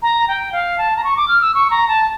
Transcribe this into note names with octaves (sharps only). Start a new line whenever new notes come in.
A#5
G5
F5
A5
A#5
C#6
D6
F6
E6
C#6
A#5
A5